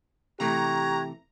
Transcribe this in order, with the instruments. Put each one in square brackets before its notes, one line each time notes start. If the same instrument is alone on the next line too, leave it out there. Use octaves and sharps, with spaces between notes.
[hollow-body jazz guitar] C3 E3 A3 [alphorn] G4 [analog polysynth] A#5 [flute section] C#6 F#6 G#6